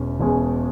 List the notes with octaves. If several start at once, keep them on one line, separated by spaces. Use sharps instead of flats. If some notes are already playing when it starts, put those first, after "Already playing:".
Already playing: E1 E2 B2 C#4
E1 E2 B2 G#3 C#4